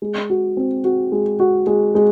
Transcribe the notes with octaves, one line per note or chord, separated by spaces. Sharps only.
G#3
F#4
C4
F#4
G#3
F#4
G#3
G#3